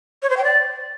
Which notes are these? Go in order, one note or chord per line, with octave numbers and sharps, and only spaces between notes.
C#5
C5
G5
D5